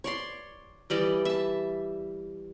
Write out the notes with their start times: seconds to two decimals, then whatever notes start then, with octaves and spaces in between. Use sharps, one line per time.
0.04 C#5 D5 C6
0.90 E3 G3 D5 D#5
1.25 E5 A5